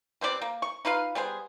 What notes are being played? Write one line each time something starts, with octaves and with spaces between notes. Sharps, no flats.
B2 C4 C#4 D5
A#3
C#6
D#4 F4 B4 F5
G3 B3 G#4 C5